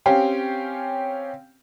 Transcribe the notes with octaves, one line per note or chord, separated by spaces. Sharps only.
C4 C#4 G4 F5 G5